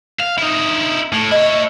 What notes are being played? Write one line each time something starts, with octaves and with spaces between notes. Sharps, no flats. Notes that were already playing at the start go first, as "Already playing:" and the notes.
F5
D#4 E4
A2
E4 C#5 D#5